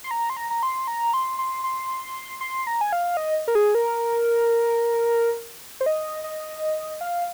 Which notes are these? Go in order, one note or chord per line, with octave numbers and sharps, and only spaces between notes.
C6
A#5
C6
A#5
A#5
C6
A#5
C6
C6
C6
C6
A#5
G#5
F5
D#5
A#4
G#4
A#4
C5
D#5
D#5
F5